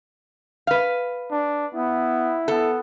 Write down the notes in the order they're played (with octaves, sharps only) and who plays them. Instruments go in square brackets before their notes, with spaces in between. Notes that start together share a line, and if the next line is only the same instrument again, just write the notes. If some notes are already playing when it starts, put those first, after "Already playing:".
[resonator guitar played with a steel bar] B4 F5
[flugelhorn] D4
[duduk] B3 [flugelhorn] E4
[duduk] B3 [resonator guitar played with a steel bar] A4